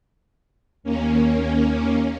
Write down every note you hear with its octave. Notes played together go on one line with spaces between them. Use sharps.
D#2 A#3 C#4